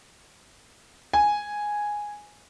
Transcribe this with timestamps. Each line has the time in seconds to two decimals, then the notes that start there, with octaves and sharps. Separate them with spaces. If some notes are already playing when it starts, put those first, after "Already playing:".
1.13 G#5